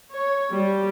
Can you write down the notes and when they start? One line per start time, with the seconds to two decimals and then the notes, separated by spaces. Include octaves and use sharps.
0.13 C#5
0.54 G3